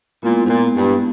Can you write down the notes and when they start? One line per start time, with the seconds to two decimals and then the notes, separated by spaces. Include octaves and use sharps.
0.23 A#2 G#3 B3 E4
0.44 G#2
0.49 A#2
0.76 G2